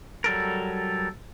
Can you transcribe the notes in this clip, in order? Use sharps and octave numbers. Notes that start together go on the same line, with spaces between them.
F#3 G3 A4 A#4